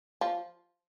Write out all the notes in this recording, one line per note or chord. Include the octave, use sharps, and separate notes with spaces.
F3